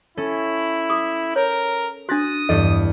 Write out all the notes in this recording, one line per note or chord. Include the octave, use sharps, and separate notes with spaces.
C#4 E4 A4
D6 D#6
A#4 C#5
D4 F#4 D#6 F#6 A6 A#6
E2 G2 A4 D#5